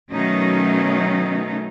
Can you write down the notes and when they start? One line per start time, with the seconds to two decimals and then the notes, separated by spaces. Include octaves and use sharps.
0.12 B2 D#3 F#3 A3 C#4 D#4